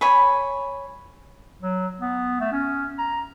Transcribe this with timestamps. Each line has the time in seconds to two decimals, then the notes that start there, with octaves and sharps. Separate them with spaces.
0.01 C#5 G#5 B5
1.62 F#3
2.01 B3
2.41 A3
2.53 C#4
2.98 A#5